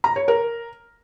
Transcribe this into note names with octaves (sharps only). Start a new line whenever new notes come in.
A#5
C#5
A#4